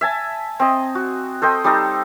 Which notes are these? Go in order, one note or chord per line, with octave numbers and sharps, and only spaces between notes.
E5 G#5 A5
C4 D#5
F#4
A4 C5 D#5 G5
G3 D#4 A4